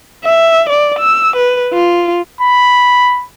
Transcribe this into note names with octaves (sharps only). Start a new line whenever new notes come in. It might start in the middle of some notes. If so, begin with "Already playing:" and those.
E5
D5
E6
B4
F4
B5